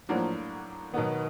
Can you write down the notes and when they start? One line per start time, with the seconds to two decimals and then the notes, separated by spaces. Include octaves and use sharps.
0.09 A2 F3 F#3 A#3 D4 F#4
0.94 B2 D#3 F#3 B3